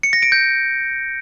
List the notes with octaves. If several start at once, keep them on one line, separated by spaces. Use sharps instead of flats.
C#7
A#6
D7
G6